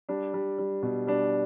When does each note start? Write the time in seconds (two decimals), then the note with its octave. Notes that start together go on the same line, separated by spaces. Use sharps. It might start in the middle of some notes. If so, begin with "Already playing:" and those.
0.09 G3 D4
0.34 G3
0.59 G3
0.83 B2
1.07 G3 D4